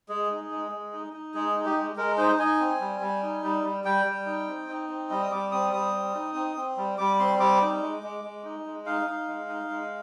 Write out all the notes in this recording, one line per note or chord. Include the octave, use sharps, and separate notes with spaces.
G#3 G#4
D#4
G#3
G#3
D#4
D#4
G#3 G#4
D#4
G4
G#3
G#3 A#4
D#4 C5
D#4 G#5
C4
G3
G3
D#4
G3
G3
G3 G5
G3
D#4
C4
D#4
C4
G3 D#5
D#6
G3 D6
C4 D#6
G3 D#6
C4
D#4
C4
C4
G3
G3 D6
C4 C6
G3 D6
D#4
G#3
G#3
G#3
D#4
G#3
D#4 F5
D#4
G#3
D#4
G#3